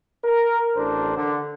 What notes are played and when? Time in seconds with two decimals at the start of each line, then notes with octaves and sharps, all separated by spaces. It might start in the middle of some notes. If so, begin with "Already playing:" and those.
0.25 A#4
0.76 A1 D4 A4 A#4 C5
1.16 D3